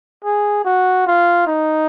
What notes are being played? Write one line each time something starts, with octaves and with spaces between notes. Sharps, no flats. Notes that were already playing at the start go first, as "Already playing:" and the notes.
G#4
F#4
F4
D#4